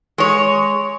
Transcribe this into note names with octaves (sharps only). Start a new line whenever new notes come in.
G#3 C#5